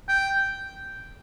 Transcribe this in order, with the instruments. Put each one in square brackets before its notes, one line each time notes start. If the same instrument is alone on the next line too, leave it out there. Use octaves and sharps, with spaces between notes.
[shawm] G5